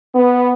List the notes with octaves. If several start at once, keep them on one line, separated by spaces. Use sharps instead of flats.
B3